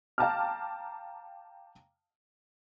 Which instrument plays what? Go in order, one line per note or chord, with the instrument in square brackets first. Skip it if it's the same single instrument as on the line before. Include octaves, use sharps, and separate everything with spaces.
[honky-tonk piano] F5 G5 A5 A#5 D6 F6